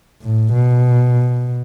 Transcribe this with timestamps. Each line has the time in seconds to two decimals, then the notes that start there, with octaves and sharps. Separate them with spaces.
0.21 A2
0.52 B2